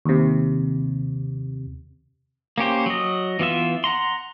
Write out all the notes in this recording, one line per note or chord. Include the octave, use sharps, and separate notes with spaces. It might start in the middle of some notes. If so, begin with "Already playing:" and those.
D#2 C3
A#3 C#4 G4 C5
F#3 D#5
E3 B3 F4 E5
F#5 A#5 C6